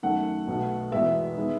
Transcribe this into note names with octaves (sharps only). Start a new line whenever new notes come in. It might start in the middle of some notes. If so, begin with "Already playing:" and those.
F#2 D#3 A3 F#5
B1 B2 A3
E1 E2 B2 G#3 B3 E5
D#3 G#3 B3